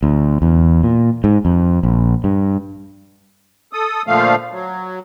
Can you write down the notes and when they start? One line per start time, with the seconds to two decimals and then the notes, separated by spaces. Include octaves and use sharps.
0.03 D2
0.42 E2
0.83 A#2
1.24 G#2
1.45 F2
1.83 A#1
2.24 G2
3.73 A4 D#6
4.07 A#2 D3 F3 A3 F5
4.52 F#3